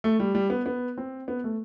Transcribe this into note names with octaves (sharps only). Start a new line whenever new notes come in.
A3
G3
G3
B3
B3
C4
B3
A3